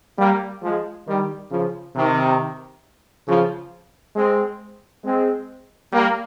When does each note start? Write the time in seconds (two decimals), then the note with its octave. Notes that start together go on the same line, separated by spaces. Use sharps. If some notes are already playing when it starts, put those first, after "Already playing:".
0.19 G3 A#3
0.63 F3 G#3
1.07 D#3 G3
1.51 C#3 F3
1.96 C3 D#3
3.28 C#3 F3
4.15 G#3 C4
5.04 G#3 C4
5.92 G3 A#3